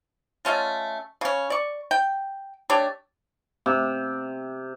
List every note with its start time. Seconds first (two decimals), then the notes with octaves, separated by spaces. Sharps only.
0.45 G#3 A3 C#4 F4
1.21 C#3 C#4
1.50 D5 C#6
1.91 G5
2.70 A3 D4 G4 C#5
3.66 C3